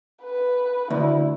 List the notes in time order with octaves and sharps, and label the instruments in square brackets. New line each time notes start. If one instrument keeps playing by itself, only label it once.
[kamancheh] B4
[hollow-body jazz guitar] D2 [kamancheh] E4